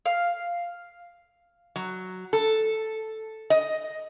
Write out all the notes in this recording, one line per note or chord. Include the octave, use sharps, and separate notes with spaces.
F5
F#3
A4
D#5